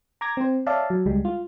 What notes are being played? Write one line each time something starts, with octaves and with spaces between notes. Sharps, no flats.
A#5 D6 G#6 A#6
C4 C5
C#5 D5 E5 F5 A5
F#3
C#2 G3 G#3
F4